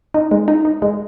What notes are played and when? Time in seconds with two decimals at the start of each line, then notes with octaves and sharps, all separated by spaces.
0.14 D#4
0.31 G#3
0.48 D#4
0.65 D#4
0.82 G#3